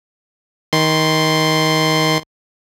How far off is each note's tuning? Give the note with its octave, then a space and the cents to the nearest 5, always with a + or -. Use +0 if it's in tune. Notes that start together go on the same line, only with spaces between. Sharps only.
D#3 +20 C6 +0